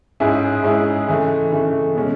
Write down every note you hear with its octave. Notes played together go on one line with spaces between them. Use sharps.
G#2 G#3 C#4 E4 G#4
G#2 G#3 C#4 E4 G#4
C#3 E3 A3
C#3 E3 A3
B2 G#3 C#4